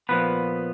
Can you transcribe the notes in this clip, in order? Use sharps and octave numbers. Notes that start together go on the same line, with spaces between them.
A#2 F3 B3 B4